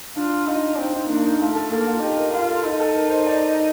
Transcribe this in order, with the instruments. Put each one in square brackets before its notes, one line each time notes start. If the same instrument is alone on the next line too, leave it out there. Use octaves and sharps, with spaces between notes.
[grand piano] D4 [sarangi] F4
[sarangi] D#4 [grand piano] F4
[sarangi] C4 [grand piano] D#4
[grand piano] D#4
[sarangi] A#3 [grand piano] D4
[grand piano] D#4
[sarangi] A3 [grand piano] F4
[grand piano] A4
[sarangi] A#3 [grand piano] A4
[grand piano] F4
[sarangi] D#4 [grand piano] G4
[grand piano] A#4
[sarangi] F4 [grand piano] F5
[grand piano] A4
[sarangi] D#4 [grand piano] A4
[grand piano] A4
A#4
C5
D5